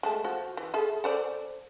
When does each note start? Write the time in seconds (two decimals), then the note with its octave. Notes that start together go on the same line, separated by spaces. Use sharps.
0.03 G#3 A3 A5
0.24 F3 F#4
0.57 E3
0.74 G#4 A4 E5
1.04 A4 C5 D5